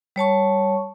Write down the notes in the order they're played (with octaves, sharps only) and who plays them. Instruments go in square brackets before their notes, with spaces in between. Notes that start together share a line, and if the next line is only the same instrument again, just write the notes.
[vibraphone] G3 C#5 A5 C#6